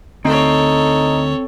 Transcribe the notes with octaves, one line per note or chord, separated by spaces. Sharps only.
D2 C4 D#4 A4 C#5